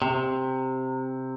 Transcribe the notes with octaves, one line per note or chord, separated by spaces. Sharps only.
C3